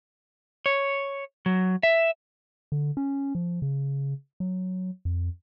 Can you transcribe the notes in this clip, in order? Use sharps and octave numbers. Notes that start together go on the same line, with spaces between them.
C#5
F#3
E5
D3
C#4
F3
C#3
F#3
F2